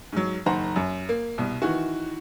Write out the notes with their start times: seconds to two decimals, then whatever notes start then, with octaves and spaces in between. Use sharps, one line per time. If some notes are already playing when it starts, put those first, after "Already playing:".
0.13 G#2 F#3
0.46 F#1 D#3 C5 F#5 A#5
0.76 F#2
1.09 A#3
1.38 C2 B2
1.62 D#3 E3 F#4